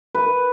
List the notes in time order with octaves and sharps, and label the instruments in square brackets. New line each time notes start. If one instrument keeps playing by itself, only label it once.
[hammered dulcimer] B4